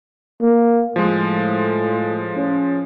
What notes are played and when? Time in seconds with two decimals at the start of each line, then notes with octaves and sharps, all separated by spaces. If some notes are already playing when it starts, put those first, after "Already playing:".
0.41 A#3
0.96 A2 F3 G#3
2.36 C#4